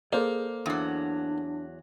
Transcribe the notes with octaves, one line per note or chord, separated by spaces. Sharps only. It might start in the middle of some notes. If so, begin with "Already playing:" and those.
A#3 G#4 A4 C5 D5
E2 F#3 D4